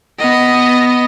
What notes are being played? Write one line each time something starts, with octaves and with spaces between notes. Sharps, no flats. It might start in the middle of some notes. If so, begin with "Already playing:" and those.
B3 D#5